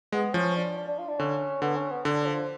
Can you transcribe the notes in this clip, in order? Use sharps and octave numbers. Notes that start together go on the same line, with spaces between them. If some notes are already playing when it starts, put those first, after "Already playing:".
G#3 B3
F3 C#4
D4
D4
D4
F4
D4
D3 C#4
D3 B3
C#4
B3
D3 D4
F3